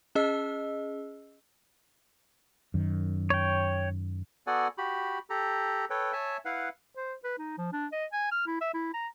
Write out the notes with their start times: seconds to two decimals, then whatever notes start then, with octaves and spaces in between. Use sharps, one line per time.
0.15 C#4 G#4 D#5 E6
2.74 F#2 D#3
3.30 C#5 G5
4.47 B3 F#4 A4 D5 F#5 G#5
4.78 F#4 G4 B5
5.30 G4 A4 A#5
5.90 A4 B4 C#5 G5
6.13 C#5 E5 G#5 A5
6.45 E4 B4 F5 F#5
6.96 C5
7.24 B4
7.38 D#4
7.58 F3
7.73 D4
7.92 D#5
8.13 G#5
8.32 F6
8.47 E4
8.61 E5
8.74 E4
8.94 A#5